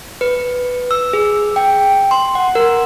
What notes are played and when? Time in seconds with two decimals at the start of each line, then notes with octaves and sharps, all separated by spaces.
0.21 B4
0.91 E6
1.13 G#4
1.56 G5
2.11 C6
2.35 F#5
2.55 A#4